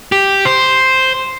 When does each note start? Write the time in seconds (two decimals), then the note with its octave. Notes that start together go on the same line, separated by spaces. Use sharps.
0.12 G4
0.45 C5